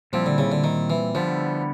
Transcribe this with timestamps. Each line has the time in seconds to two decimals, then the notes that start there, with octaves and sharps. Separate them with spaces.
0.13 A#2 F3 G3 C4 E4
0.26 D3
0.38 C#3
0.52 D3
0.64 D#3
0.90 E3
1.15 D3 F3 G3 B3 E4